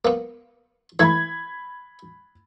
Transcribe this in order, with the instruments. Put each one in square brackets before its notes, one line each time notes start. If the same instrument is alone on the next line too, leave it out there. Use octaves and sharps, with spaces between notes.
[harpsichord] A#3 B3
[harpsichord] E3 A3 [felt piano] B5 G#6